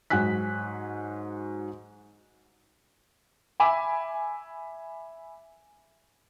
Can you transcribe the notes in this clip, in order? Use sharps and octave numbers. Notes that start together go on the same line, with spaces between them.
G#2 F#3 G#5 F#6 B6
E5 G#5 B5 D6